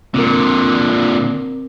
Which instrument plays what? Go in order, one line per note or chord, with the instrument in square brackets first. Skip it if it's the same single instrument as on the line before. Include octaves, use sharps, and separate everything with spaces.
[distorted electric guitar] A#2 D3 [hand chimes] C4 A#4